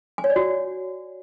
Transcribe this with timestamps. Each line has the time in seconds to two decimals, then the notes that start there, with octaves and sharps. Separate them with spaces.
0.18 G#5
0.24 C#5
0.30 D5
0.36 F#4